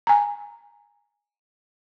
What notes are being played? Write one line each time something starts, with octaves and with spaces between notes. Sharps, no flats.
G#5 A#5